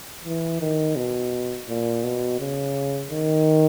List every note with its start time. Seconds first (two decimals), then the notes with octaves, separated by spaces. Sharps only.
0.25 E3
0.61 D#3
0.96 B2
1.69 A#2
2.04 B2
2.40 C#3
3.11 D#3